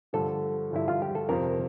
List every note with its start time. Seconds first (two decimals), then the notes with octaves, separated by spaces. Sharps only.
0.13 G2 D3 F3 A4
0.71 G2 D3 F3 E4
0.88 F4
1.02 G4
1.15 A4
1.29 F2 C3 F3 A#4